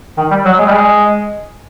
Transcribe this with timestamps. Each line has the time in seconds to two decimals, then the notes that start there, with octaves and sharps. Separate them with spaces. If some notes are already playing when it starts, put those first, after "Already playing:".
0.17 D#3
0.31 G3
0.45 F#3
0.58 G#3
0.67 G3
0.72 G#3